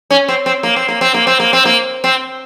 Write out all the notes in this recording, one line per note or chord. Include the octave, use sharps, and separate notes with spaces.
C#4
C4
C4
A#3
C4
A#3
C4
A#3
C4
A#3
C4
A#3
C4